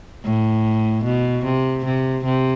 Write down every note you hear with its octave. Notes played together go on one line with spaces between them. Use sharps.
A2
B2
C3
C3
C3